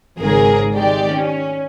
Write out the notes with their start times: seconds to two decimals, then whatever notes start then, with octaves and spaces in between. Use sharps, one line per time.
0.18 G#1 G#2 C#3 G#4 A#4
0.74 D#3 G#3 G4 D5
1.13 C#4